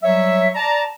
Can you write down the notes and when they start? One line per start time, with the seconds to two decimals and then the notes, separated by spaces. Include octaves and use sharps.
0.03 F#3 G3 C#5 E5
0.55 D5 A5 A#5